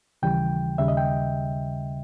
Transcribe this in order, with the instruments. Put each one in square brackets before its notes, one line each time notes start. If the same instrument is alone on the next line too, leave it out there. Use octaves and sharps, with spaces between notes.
[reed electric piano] D#2 C#3 E3 G3 G5
D#2 C#3 G3 E5
D#5
G5